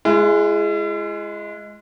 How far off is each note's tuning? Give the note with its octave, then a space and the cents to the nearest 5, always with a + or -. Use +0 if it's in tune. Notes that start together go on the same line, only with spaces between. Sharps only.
G#3 +5 E4 +45